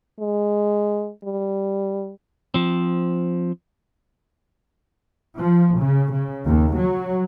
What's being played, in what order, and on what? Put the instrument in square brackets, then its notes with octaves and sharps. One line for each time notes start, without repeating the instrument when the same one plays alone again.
[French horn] G#3
G3
[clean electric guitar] F3 C4
[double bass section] F3
C#3
C#3
D#2
F#3